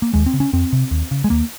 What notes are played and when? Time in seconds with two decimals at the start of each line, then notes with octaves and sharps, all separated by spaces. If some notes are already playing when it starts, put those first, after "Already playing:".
0.02 A#3
0.14 D#2 G#3
0.26 C4
0.33 C#3
0.40 C#4
0.53 F2 C4
0.73 C3
0.91 D#2
1.11 C#3
1.24 G#3
1.30 D#2 A#3